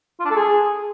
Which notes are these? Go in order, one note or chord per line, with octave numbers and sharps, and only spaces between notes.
F4
D4
A4
G#4